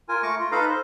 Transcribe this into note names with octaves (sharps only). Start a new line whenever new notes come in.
F4 A#4 G#5
A3 A#5 C#6 D6
F4
D#4 A4 B4 F5 A#5
C5